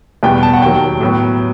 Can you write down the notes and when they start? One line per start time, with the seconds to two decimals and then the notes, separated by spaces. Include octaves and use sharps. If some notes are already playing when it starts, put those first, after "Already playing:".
0.23 E2 B2 G3 B3 G5
0.43 A5
0.53 F#5
0.62 D#2 D#3 F#3 G5
1.01 A2 F#3 B3